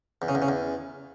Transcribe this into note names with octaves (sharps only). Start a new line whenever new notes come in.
E2
C#3
E2
C#3
E2